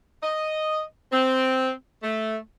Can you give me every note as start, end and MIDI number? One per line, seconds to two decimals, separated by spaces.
0.23 0.82 75
1.13 1.71 60
2.03 2.37 57